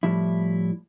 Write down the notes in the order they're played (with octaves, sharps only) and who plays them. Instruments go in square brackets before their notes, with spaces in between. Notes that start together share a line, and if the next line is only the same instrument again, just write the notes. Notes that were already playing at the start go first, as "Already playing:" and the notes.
[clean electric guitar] A2 F3 G3 E4